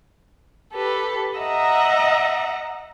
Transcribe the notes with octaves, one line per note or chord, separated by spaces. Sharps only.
G4 A4 B4
D#5 E5 F#5 A#5